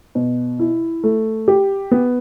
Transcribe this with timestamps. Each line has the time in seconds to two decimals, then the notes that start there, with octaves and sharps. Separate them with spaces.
0.15 B2
0.59 E4
1.04 A3
1.48 G4
1.91 B3